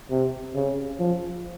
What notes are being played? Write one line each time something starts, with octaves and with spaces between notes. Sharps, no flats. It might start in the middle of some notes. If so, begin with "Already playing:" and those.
C3
C#3
F3